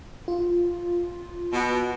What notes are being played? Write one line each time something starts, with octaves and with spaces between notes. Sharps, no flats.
F4
B2